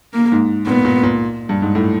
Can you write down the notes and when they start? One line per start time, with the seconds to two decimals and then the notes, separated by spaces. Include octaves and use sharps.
0.14 A#3
0.32 G#2
0.67 A#2 B3
0.85 A#2
1.03 A#2
1.49 G2
1.62 G#2
1.75 A2